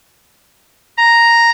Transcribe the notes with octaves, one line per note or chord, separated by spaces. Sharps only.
A#5